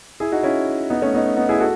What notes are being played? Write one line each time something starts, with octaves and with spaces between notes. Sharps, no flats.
E4 G#4
D#4 F#4
C#4 E4
B3 D#4
A3 C#4
B3 D#4
B3 D#4
E4 G#4
F#4 A4